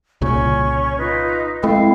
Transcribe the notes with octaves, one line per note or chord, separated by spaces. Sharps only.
C2 A#2 C#3 C#4 C#6
D#4 F4 B4
G#3 A3 C4 E4 F5